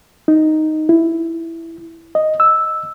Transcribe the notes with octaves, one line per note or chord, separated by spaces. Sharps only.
D#4
E4
D#5
E6